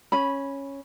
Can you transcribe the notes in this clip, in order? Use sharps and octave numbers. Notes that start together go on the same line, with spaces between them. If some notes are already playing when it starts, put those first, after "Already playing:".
C#4 B5